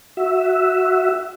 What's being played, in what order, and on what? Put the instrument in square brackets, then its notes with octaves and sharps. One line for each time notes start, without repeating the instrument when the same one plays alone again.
[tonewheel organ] F#4 E5